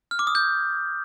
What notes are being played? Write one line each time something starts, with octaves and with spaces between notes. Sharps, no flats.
F6
D6
D#6
G6